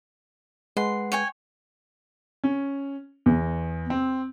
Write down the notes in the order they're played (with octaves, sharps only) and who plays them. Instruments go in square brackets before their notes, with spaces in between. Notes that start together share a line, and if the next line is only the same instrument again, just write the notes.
[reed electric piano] G#3 B4 F#5 [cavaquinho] C6
[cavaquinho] C#5 G5 G#5
[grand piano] C#4
E2
C4